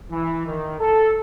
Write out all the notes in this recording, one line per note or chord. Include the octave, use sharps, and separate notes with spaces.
E3
D#3
A4